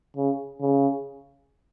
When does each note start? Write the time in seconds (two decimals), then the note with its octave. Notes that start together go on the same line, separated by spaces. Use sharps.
0.16 C#3
0.61 C#3